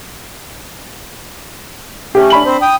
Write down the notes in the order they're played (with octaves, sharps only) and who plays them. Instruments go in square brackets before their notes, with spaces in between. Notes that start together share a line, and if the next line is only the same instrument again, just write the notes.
[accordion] A3 C#4 [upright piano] G4
[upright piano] D4 B5 F#7
[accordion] C4 C5
G5 D#6